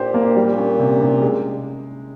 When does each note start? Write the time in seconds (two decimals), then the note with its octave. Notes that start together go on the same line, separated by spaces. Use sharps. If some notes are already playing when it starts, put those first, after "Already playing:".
Already playing: A#2 G4 C5
0.14 A#3
0.29 G#2
0.36 A#2 G3
0.57 C#4
0.80 C3
1.01 C3
1.22 G#3